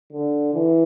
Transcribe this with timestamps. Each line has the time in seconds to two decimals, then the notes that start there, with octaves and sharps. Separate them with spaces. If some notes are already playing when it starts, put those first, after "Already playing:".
0.13 D3
0.54 E3